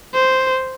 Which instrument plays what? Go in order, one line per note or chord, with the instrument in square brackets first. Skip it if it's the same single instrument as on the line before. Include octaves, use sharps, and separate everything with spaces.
[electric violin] C5